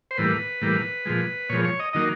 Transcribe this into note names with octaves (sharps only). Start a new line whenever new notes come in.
C5
A2 E3 G3 A#3 B4
A2 E3 G3 A#3
A#2 F3 G#3
A#2 F3 G#3 C#5
C#5
D#5
D#3 F#3 A#3 D#5